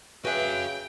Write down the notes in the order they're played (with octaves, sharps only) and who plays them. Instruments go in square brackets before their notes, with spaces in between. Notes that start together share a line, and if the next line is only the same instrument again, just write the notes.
[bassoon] C#3 [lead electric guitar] F#4 G#5 [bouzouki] B4 E5 F5 [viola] G5